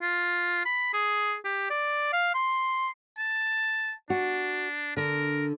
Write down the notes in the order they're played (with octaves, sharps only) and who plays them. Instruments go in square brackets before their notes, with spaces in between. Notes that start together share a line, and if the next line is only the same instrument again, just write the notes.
[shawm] F4
B5
G#4
G4
D5
F5
C6
[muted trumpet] A5
[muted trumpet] D4 [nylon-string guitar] F#4
[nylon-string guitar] D3 [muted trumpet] A#4